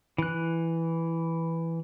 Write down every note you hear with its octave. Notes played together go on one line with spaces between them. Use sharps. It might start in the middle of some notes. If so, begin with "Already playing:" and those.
E3 F#6